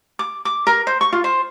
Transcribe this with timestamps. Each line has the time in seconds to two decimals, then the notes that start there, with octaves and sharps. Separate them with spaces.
0.19 D6
0.45 D6
0.67 A#4
0.87 C5
1.01 C#6
1.13 F4
1.24 C5